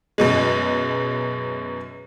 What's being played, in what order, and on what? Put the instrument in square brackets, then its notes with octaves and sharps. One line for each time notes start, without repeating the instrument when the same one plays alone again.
[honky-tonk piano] F#2 B2 G#3